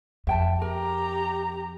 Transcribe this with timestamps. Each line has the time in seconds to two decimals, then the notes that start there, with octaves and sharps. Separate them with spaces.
0.27 F2 E5 G5 A5
0.62 G4 A#4 A#5